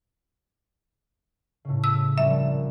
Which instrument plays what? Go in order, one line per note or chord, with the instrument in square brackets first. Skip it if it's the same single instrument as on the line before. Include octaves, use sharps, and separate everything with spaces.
[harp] A2 C#3
[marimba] E6
[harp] A#1 F#2 G3 [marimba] E5